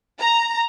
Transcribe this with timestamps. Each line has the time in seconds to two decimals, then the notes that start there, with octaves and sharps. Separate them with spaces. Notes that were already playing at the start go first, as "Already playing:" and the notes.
0.20 A#5